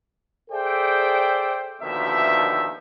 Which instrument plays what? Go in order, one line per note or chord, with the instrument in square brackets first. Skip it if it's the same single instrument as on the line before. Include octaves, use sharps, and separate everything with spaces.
[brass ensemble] G#4 A4 C5 D5 E5 G5
D#2 B2 D3 D#3 F3 E5